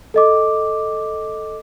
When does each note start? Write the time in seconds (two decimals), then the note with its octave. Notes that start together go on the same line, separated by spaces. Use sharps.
0.14 A4 D#5 D6